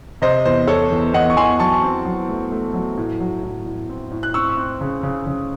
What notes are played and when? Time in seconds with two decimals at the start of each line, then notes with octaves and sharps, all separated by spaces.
0.22 C3 C5 D#5
0.45 E2 C5
0.67 E2 A4 C#5
0.91 E2
1.14 E2 D#5 F#5
1.30 C#6
1.37 E2 G#5 C6
1.60 F#3 A5 C#6
1.83 C4
2.05 F#3
2.29 A3
2.52 A3
2.74 F#3
2.97 A2
3.20 F#3
3.43 A2
3.66 A2
3.89 C4
4.11 A2
4.23 F#6
4.34 C4 C#6 E6
4.57 C4
4.81 C#3
5.03 C#3
5.27 C#3